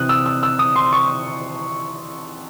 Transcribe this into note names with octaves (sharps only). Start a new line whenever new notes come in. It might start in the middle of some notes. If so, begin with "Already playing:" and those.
Already playing: C3 E3 D#6 F#6
E6
E6
E6
D#6
C6
C#6